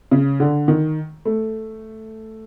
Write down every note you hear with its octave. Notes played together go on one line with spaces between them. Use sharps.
C#3
D3
D#3
A3